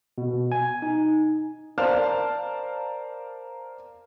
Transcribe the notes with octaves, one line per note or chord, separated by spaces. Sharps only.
B2
G#5
D#4
A#4 C5 D5 F5 A5 F6